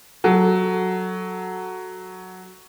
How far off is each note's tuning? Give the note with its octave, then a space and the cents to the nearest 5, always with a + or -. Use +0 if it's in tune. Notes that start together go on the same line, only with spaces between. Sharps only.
F#3 +0 A4 +0